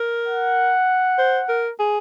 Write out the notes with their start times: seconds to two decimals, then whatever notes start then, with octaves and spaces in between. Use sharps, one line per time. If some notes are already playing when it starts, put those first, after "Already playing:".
Already playing: A#4
0.28 F#5
1.18 C5
1.49 A#4
1.79 G#4